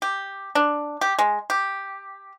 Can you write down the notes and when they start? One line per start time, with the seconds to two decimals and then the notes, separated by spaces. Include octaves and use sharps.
0.02 G4
0.55 D4
1.01 G4
1.19 G#3
1.50 G4